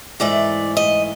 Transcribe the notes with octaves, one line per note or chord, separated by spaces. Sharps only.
G#2 E3 A3 D5
D#5